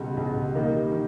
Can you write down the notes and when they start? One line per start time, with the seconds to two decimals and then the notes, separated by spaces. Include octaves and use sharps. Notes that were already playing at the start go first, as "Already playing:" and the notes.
Already playing: C#2 B2 G3
0.17 C#2 B2 G3
0.55 D#3 G3 A#3 D#4
0.92 D#3